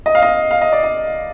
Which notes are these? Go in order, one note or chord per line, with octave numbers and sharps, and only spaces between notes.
D#5
F5
D#5
F5
D#5
D5
D#5